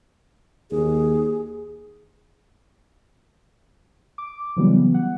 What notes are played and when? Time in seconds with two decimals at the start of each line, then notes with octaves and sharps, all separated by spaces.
0.71 D#2 G#4
4.18 D6
4.56 C#3 E3 F#3 G3 B3
4.94 F#5